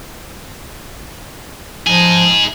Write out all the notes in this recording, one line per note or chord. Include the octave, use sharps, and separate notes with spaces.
F3 D#4 G#4